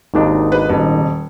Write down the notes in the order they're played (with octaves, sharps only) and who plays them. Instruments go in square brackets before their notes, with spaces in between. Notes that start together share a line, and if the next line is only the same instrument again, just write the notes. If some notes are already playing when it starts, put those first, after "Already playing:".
[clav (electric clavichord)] G#1 D#2 D4 [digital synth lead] D#4
[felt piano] B4
D#1